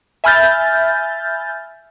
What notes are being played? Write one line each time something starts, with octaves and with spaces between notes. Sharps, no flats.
E5 G#5 B5 F6 G6 A6